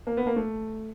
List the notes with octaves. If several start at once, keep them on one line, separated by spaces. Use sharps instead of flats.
A#3
B3
A#3
A3